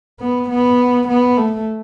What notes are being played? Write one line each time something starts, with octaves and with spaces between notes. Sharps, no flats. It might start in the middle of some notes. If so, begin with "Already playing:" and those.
B3
B3
B3
A3